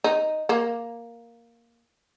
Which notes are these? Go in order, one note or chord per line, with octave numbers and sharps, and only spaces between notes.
D#4
A#3